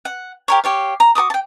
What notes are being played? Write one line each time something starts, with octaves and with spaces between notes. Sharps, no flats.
F#5
G4 A#4 C#5
G4 C#5 F5
A#5
F#4 A#4 D6 D#6
G5 A5